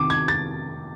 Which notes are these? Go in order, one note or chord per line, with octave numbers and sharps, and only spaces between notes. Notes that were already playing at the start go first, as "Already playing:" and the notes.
Already playing: C3 D#3 D6
G#6
A6